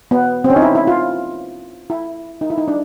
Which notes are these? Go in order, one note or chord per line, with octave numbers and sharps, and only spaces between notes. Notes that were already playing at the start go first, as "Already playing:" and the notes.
B3
C4
C#4
D#4
E4
E4
F4
E4
D#4
E4
D#4
D4